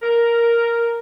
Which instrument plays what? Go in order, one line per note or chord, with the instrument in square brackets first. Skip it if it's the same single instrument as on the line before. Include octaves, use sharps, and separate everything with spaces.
[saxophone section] A#4